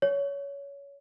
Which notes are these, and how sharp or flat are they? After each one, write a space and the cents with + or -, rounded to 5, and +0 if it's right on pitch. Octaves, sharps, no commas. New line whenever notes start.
C#5 +20